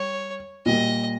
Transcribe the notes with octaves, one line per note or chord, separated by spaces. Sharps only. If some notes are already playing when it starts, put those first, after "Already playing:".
Already playing: G3 C#5
A#2 G3 A#3 D#5